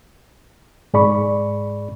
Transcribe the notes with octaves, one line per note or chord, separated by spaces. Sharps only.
G#2 G#4 D5 B5 C#6